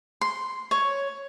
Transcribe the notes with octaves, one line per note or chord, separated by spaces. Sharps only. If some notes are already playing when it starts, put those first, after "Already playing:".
C6
C#5